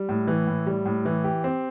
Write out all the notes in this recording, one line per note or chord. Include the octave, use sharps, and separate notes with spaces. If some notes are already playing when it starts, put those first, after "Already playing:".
Already playing: G3
A2
E3
A2
G3
A2
E3
G4
C4